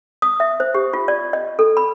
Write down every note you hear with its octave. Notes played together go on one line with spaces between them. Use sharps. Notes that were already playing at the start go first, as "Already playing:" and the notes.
D#6
E5
C5
G4
F4
D5
D#5
A4
B5